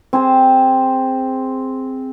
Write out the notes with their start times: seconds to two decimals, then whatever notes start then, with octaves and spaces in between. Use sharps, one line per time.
0.13 C4 G#4 C5